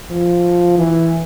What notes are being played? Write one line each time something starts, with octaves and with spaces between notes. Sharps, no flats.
F3
E3